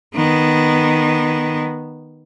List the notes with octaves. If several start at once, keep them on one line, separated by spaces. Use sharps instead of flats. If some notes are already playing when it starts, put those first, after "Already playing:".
D#3 B3